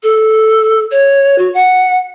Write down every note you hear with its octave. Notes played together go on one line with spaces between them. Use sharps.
A4
C#5
F#4
F#5